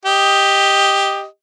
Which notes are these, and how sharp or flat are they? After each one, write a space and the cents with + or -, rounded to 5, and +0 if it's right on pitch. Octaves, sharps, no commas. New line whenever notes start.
G4 +5 D#5 +0